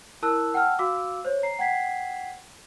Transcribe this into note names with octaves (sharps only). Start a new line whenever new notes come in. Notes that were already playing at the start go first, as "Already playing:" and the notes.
E4 A#4 A5 E6 F#6
F#5 G5 A5 E6 F6
F#4 F5 D6 E6
C5 C#5
A#5 C7
F#5 G5 G#6 B6 C7